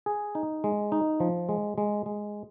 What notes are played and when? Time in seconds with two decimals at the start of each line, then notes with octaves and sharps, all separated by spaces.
0.06 G#4
0.35 D#4
0.64 G#3
0.92 D#4
1.20 F3
1.49 G#3
1.78 G#3
2.06 G#3